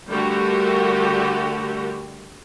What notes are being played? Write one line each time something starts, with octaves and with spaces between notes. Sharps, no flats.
D3 G3 A3 F#4 G4 A#4